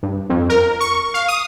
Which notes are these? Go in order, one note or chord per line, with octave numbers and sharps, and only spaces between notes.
G2
F2
A#4
C#6
F5
D#6